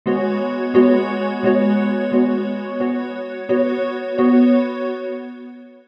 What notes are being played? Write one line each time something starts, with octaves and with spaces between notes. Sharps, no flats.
G#3 B3 F#4 C#5
G#3 B3 F#4 C#5
G#3 B3 F#4 C#5
G#3 B3 F#4 C#5
B3 F#4 C#5
B3 F#4 C#5
B3 F#4 C#5